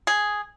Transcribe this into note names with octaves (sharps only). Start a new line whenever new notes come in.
G#4